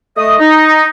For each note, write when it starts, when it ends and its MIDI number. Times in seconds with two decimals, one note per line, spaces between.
0.17 0.38 57
0.17 0.38 75
0.17 0.38 87
0.40 0.88 63